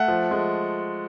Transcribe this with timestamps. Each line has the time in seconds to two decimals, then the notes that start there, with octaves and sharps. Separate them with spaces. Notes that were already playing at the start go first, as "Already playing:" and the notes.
Already playing: A3 F#5
0.08 F3
0.31 G#3